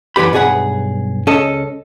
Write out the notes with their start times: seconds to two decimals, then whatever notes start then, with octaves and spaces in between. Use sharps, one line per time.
0.16 F#2 E3 B3 G4 B5
0.33 B1 G2 G#4 C#5 F#5 B5
1.27 C#2 C#4 A4 D#5